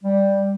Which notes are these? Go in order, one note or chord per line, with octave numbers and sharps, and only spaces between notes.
G3